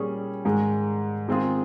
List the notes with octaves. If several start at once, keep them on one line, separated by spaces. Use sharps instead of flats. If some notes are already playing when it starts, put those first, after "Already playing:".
Already playing: A#2 G3 C#4 G#4
G#2 D#3 G#3
D#3 G#3 C4 F4 G#4